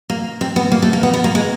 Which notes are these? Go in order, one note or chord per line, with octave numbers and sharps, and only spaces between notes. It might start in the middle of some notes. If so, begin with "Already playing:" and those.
A#3
C4
B3
A#3
A3
A#3
B3
B3
A#3
G#3